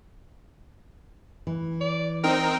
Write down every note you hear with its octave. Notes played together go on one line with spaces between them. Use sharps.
E3
D5
C4 D#4 A#4 G5